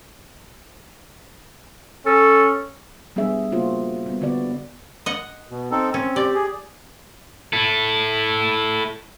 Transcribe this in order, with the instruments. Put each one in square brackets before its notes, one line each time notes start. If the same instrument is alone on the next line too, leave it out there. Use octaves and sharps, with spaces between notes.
[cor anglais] C#4 [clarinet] A4
[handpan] G3 B3 D4 G#4 E5
C#3 A#3 F4 F#4 C5
G3 B3
D3 B3 F#4 D5
[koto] D#5 F#5
[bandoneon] B2
C4 D#4 A4
[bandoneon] C4 [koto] C#4
[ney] G4 [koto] D5
[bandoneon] G#4
[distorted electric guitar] E4 A4